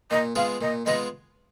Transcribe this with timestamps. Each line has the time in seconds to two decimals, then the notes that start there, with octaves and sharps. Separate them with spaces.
0.11 A#2 D#5
0.35 G#3 B3 F4 G#4 F5
0.61 A#2 D#5
0.86 G#3 B3 F4 G#4 D#5